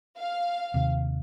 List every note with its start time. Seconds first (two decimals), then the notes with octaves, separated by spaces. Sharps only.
0.18 F5
0.74 D#2 C3